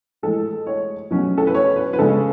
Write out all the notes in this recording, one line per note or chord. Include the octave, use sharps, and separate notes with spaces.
A2 E3 G#3 A4
C#5
B2 F#3 A3 C#4
A4
B4
C#5
B4
B4
C#3 G#3 C#4 A4